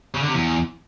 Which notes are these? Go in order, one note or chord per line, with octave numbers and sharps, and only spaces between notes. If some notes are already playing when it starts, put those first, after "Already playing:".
C#3
D3
C3
E2